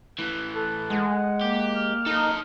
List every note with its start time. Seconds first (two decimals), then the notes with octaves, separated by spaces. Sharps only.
0.19 A2 E3 F#6
0.56 A4
0.90 G#3 F#5
1.41 A#3 G4
1.76 F6
2.06 D#4 A4 D#5